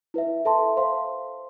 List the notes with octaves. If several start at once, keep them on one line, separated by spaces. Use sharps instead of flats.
E4 B4 E5
A4 E5 A5 C6
C5 F5 C6